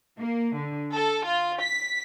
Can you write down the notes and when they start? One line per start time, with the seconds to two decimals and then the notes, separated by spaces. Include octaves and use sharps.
0.18 A#3
0.56 D3
0.91 A4
1.25 F4
1.60 B6